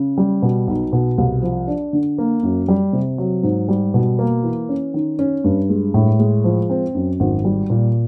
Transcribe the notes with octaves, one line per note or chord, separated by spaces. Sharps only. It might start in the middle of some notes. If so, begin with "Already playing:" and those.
Already playing: C#3
G3
B2
B1
B2
C2
F3
D4
D3
A#3
F#2
G3
C3
F#3
G#2
G3
B2
A#3
E3
C#4
D#3
C#4
G2
G#3
A2
G#3
F3
C4
F#2
G#1
G3
A#2